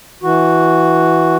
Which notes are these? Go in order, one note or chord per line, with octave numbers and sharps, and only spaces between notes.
E3 F#4